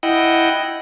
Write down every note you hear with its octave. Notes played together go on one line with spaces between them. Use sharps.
E4 D#5 F#5 G5